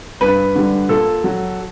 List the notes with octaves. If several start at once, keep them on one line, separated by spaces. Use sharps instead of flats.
G2 B4
D3 G3
A#2 A4
F#3